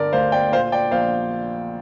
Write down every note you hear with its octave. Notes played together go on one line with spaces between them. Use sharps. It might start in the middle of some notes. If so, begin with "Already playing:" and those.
Already playing: G1 D3 A#4 D5
D2 C5 F5
D5 G5
A#2 C5 F5
D5 G5
A#1 C5 F5